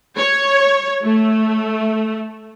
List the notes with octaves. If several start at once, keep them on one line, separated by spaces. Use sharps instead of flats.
C#5
A3